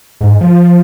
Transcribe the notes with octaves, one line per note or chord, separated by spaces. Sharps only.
G#2
F3